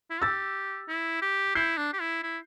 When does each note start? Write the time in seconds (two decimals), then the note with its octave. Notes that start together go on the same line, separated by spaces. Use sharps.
0.10 E4
0.22 G4 E6 A6
0.88 E4
1.22 G4
1.55 E4 G6 C7
1.77 D4
1.93 G4
2.01 E4
2.23 E4